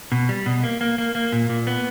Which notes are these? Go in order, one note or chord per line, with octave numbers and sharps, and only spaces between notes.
B2
G3
B2
A#3
A#3
A#3
A#3
A#2
A#2
B3